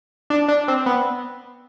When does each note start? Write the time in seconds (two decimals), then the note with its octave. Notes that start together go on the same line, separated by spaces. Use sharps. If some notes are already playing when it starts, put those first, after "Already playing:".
0.30 D4
0.48 D4
0.68 C4
0.86 B3